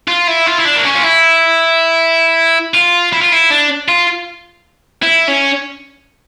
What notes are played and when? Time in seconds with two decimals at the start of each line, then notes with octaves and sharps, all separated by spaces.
0.08 F4
0.28 E4
0.47 F4
0.60 E4
0.66 D4
0.77 A#3
0.85 C#4
0.95 F4
1.03 E4
2.74 F4
3.13 E4
3.22 F4
3.32 E4
3.51 D4
3.89 F4
5.03 E4
5.28 C#4